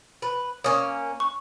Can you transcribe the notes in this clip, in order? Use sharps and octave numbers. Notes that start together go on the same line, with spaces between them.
B4
A#3 C#4 C#5 D#6
C#6